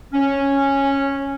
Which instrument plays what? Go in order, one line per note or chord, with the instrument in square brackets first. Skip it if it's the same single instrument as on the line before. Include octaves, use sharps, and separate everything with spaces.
[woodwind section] C#4